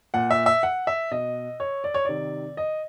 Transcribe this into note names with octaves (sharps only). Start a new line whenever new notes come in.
A#2 F#5
E5
E5
F#5
E5
B2 D#5
C#5
D5
C#5
C3 D#3 D5
D#5